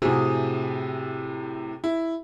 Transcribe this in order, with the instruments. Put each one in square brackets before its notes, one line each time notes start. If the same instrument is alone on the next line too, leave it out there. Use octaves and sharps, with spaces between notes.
[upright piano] A2 C3 [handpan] F#4 G#4
[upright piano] E4